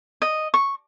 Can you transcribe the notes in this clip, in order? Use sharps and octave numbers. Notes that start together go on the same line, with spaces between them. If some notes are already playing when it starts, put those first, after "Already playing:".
D#5
C#6